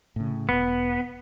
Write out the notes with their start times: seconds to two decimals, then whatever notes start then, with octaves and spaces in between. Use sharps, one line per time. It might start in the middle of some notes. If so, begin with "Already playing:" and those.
0.16 A2 C#3
0.49 E1 B3